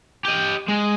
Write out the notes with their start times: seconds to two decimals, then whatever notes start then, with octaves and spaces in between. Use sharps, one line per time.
0.25 G4 D#5
0.68 G#3